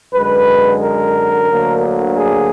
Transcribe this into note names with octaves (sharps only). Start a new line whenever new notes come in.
F#2 D3 G#3 B4
A#4
D2 D3 F#3 A#3
G#4